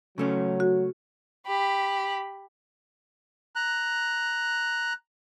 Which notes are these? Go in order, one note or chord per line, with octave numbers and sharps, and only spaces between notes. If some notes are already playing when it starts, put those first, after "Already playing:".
C#3 F#3 A3 C#4
F#4
G4 B5
A#5 F#6